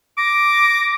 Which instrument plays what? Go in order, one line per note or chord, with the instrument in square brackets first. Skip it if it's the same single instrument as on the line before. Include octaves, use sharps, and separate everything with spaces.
[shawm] D6 [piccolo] A#6